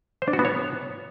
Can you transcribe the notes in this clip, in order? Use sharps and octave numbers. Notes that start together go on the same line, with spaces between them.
C5
D4
F#4
B3
C#5